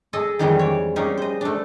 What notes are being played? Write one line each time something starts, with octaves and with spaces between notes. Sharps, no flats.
G#4 A4 D#5
F2 D#3 E3 G3 G#3 A#5
C#5 D5
G3 A#3 C#4 D#4 G#4
C5 D#5
A3 D4